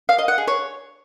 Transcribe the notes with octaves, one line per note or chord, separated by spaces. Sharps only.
F5
D#5
F#5
G#4
C#5